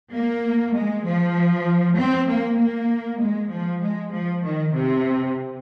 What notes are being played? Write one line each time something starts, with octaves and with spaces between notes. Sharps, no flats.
A#3
G#3
F3
C4
A#3
A#3
G#3
F3
G#3
F3
D#3
C3